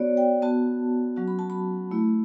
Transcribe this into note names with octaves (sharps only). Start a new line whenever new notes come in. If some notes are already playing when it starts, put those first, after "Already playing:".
Already playing: B3 F#4 C#5 D5
G5
B3 F#4 A5
F#3 C#4 F#4
B5
A5
B5
A3 E4